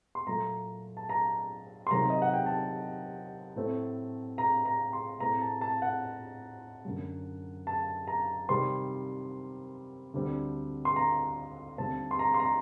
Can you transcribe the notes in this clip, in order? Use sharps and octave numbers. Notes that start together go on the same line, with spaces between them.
C6
A#2 F#3 A3 A#5
A5
A#5
C6
C3 D#3 F#3 A#5
D#5
F#5
G5
A5
A2 A3 C4
A#5
A#5
C6
A2 A3 C4 A#5
A5
A5
F#5
F#2 D3 F#3
A5
A#5
C3 D#3 G3 C4 C6
D2 D3 G3 C4
C6
A#5
D#2 D3 G3 C4 A5
C6
A#5
C6
A#5